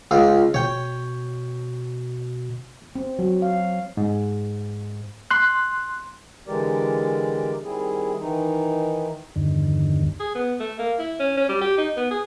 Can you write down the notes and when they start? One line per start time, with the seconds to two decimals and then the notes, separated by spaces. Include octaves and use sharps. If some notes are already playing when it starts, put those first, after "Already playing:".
0.11 C#2 F4
0.54 B2 C#5 G5
2.96 C4
3.19 F#3
3.42 F5
3.97 G#2
5.31 C6 F#6
6.48 D3 E3 G#3 G4 A#4 D5
7.64 D#3 G3 C4 E4 G#4
8.20 D#3 E3 D#4
9.36 E2 G2 D3 D#3
10.20 G#4
10.35 B3
10.60 A3
10.79 A#3
10.99 E4
11.20 C#4
11.37 C#4
11.49 G3
11.61 G4
11.78 D#4
11.97 B3
12.11 G#4